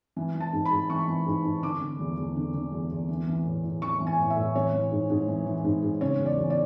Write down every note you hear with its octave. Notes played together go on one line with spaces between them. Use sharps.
E3
E3
A5
G#2
B5
G#2
E3 C#6
E3
G#2
G#2
D3 D6
D3
E2
E2
D3
D3
E2
E2
E3
E3
A2
A2
E3 C#6
E3
G#5
A2
E5
A2
E3 C#5
E3
G#2
G#2
E3
E3
G#2
G#2
C#3 C#5
E2
D5
E2
D5